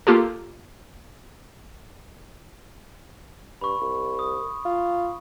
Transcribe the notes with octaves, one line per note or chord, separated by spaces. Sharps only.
A#3 F4 G4 A4
G2 B5 C#6
C2
D#6
F4